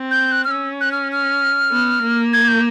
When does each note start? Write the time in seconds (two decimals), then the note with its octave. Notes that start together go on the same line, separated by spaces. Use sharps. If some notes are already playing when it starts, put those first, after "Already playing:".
Already playing: C4
0.11 G6
0.32 F#6
0.44 F6
0.51 C#4 E6
0.81 F#6
0.92 F6
1.12 F6
1.72 B3
2.03 A#3
2.33 G#6
2.48 G6